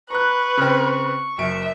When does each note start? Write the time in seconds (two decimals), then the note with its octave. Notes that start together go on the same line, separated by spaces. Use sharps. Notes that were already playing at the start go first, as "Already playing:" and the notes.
0.10 B4 A#5 C#6 F#6
0.57 C#3 C4
0.91 C#6
1.38 F#1 F#2 E5 D7